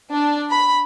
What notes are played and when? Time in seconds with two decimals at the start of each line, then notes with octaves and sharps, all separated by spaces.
0.12 D4
0.51 B5